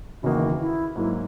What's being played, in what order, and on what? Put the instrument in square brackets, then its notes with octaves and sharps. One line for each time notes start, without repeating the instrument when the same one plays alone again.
[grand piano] F#1 E2 D#3 A#3 D#4 [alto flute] F#4
[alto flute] E4
[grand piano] G#2 F#3 A#3 [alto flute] E4